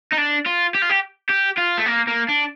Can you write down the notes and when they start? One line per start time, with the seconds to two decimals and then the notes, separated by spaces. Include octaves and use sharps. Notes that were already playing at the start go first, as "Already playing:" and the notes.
0.13 D#4
0.18 D4
0.46 F4
0.74 G4
0.82 F4
0.90 G4
1.30 G4
1.58 F4
1.78 A3
1.86 A#3
2.07 A#3
2.28 D4